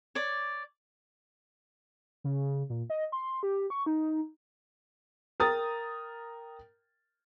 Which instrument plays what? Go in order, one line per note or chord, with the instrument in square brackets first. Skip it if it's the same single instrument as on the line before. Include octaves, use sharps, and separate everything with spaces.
[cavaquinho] C#5 D5
[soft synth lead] C#3
A#2
D#5
C6
G4
C#6
D#4
[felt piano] A#4 G5 D#6 A6